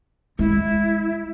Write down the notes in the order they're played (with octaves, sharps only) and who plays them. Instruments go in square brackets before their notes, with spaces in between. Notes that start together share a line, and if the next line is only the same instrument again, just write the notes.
[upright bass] G#3 [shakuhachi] E4